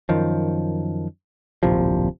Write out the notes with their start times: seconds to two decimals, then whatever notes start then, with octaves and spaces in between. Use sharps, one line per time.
0.09 F#2 D#3 F3
1.63 D1 A#1 C3 F3